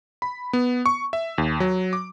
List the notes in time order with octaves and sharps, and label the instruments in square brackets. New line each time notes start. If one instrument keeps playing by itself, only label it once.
[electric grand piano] B5
B3
C#6
E5
D#2
F#3
D6